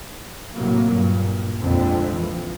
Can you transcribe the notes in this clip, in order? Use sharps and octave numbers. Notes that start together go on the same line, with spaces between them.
A2 C3 F#3 A#3
G2 A#2
A#1 F2 D3 G#3 C4
E3 F3